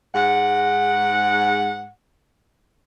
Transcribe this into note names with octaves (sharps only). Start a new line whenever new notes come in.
G#2 F#5